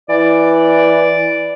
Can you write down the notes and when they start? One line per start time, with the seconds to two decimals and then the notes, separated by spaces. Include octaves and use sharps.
0.09 E3 D5